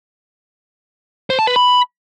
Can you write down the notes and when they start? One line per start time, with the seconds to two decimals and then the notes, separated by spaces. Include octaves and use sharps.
1.30 C5
1.39 A5
1.47 B4
1.56 B5